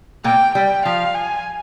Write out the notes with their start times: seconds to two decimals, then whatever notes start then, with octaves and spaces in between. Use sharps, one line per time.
0.24 A#2 A#3 G5
0.54 G3 G5
0.85 F3 F5
1.15 G#5